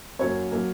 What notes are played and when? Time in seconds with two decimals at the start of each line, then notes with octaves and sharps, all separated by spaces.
0.19 F#2 F#3 A#3 C#5
0.52 F#3 A#3